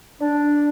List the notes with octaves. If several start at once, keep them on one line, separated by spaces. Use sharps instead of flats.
D4